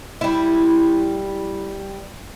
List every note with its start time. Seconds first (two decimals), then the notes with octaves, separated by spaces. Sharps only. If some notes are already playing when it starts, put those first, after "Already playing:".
0.21 G3 E4